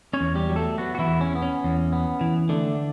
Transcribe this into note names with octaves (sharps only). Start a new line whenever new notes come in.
C#4 C#5
E2
G3 G4
F#3
A3 A4
F#3 B3 F#4
F#4
E3 E4
E2
C#4
B3
C#4
E2
B3
E3
D3 A3 D4